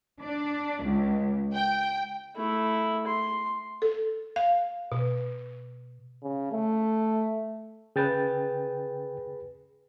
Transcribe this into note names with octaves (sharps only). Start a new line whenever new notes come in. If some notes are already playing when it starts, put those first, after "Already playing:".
D4
C#2
G5
A3 E4
C6
A4
F5
B2
C#3
A3
C#3 G#4 B4 G5 A6